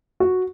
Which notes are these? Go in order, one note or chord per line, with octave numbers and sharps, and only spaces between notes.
F#4